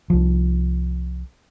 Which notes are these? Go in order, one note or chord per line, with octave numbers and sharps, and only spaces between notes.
C2 F3